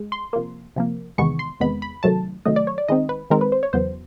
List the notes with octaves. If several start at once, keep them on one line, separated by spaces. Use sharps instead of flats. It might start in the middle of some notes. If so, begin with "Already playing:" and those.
Already playing: G#3
C6
C3 F3 A#3
C3 F3 A#3
E2 C3 D#3 G#3 B3 C#6
C6
E2 C3 D#3 G#3 B3 B5
B5
C3 D#3 F#3 A3 A5
C3 D#3 F#3 A3 D#5
D5
C#5
D5
D#3 G#3 C4 D#4 D#5
B4
D#3 G#3 C4 D#4 A#4
B4
C5
C#5
E2 C#3 F#3 B3 C5